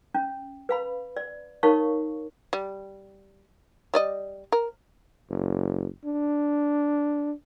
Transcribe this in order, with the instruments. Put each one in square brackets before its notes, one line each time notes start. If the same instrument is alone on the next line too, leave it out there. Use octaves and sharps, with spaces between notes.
[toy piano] C#4
B4 F5 B5
D5
D#4 A#4 C#5 F5 C#6
[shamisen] G3
G3 D5 D#5
A#4
[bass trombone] F#1
D4